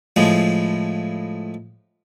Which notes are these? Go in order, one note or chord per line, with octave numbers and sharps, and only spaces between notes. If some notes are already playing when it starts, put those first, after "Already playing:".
A2 F3 G#3